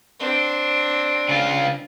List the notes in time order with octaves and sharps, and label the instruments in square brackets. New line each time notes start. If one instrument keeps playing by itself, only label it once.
[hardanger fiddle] C4 D4
[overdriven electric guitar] C#3 F4